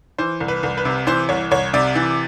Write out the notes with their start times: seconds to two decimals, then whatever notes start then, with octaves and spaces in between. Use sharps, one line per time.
0.18 E3 C5
0.40 C2
0.48 B4
0.63 C2
0.77 B4
0.85 C3
1.07 E3 C5
1.29 C2 C#5
1.51 C2 C#5
1.74 C3 D5
1.95 E3